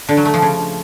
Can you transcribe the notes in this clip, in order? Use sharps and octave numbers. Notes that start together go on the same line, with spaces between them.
D3
F#3
A3
F3
C#3